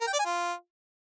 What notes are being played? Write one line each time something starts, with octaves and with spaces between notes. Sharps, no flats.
A#4
G5
D5
G#5
F4